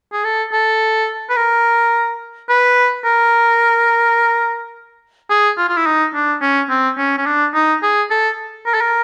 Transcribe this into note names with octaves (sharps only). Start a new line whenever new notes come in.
G#4
A4
A4
B4
A#4
B4
A#4
G#4
F4
F4
E4
D#4
D4
C#4
C4
C#4
C#4
D4
D#4
G#4
A4
A#4
A4
A#4